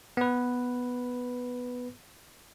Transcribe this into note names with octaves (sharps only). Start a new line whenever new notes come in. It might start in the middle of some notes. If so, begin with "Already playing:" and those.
B3 B4